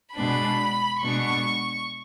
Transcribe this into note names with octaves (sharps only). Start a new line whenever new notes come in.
B2 G#3 B3 D4 B5
B2 G#3 B3 D4 C#6